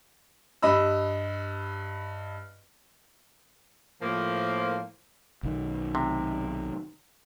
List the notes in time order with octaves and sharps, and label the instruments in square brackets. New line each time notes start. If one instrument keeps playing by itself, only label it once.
[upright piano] G2 D#5 B5 E6
[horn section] A2 F3 A#3
[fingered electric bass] B1 D#3
[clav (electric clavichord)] C3